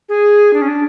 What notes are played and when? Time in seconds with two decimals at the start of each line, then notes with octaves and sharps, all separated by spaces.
0.09 G#4
0.53 D4
0.62 C#4
0.68 D4